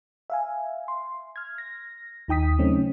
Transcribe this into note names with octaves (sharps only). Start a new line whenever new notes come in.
E5 F5 G#5
C6
F6 G#6
A#6
D#2 D#4 G5 D#6 B6
C#3 F#3 A3 C4 C#4 D#4